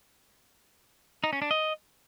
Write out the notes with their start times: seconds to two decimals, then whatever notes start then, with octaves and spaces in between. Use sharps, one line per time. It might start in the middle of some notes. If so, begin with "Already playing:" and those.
1.24 D#4
1.33 C#4
1.42 D4
1.51 D#5